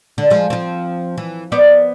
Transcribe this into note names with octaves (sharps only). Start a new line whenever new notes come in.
D3
F3 G#3
F3 C4
E3
B3 C5 D5